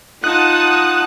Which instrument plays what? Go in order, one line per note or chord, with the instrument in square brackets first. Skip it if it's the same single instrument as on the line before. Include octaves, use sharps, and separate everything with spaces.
[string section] D#4 F#5 A5 [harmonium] F4 [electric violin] D#6 [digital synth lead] F#6